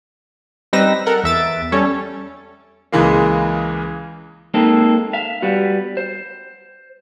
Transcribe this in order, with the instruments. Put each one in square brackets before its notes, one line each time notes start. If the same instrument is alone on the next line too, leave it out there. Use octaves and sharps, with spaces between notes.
[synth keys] G3 C4 D#4 B4 E6 A#6
A4 A#4 F#5
E2 E5 A6 D7
G3 C#4 A4 C#5
[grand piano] C#2 C#3 E3 G#3 A#3
[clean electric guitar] G#3 A#3 C4 D#4 A4
E5 F5
G3 B3 F#4
C5